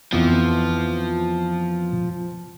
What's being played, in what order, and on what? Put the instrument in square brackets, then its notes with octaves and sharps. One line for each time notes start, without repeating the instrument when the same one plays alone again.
[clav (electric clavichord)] F2 E3 B3 [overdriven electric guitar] F3